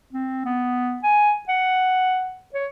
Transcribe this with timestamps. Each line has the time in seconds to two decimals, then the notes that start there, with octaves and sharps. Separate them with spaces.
0.13 C4
0.45 B3
1.03 G#5
1.49 F#5
2.54 C#5